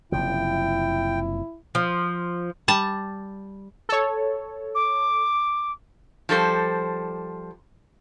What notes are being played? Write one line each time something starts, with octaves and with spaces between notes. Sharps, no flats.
F#1 C3 F3 E4 G5
F3
G3 A5
A4 C#5
D6
F3 G3 A4 C5